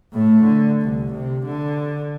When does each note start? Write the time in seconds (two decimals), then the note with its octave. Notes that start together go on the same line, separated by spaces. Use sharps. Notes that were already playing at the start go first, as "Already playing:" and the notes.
0.13 A2 A3
0.44 D3
0.82 C2
1.14 C3
1.46 D3